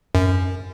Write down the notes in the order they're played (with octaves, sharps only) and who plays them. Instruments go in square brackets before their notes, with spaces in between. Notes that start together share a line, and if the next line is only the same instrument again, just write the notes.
[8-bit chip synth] F#2